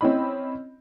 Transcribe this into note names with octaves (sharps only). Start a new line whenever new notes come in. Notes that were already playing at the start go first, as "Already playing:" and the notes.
C4 C#4 E4 D#5 B5